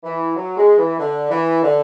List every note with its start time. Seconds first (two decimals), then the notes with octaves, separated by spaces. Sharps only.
0.03 E3
0.35 F#3
0.56 G#3
0.77 E3
0.98 D3
1.30 E3
1.63 D3